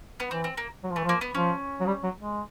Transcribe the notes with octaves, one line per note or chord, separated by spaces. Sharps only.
B3
E3 C4
C4
A#3
F#3
F3
E3 A3
F3
A#3
B3
F3 C#4
F#3
G3
F#3
G#3